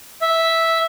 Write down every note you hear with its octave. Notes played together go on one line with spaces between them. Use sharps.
E5